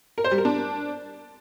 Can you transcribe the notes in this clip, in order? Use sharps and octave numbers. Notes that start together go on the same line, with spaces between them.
A#4
C5
G3
A#4
D4